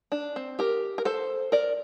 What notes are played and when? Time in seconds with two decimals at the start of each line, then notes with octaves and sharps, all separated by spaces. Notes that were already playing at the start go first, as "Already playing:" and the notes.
0.12 D4
0.36 C4
0.59 G4 A#4
0.98 A#4
1.05 A4 C5
1.52 A#4 D5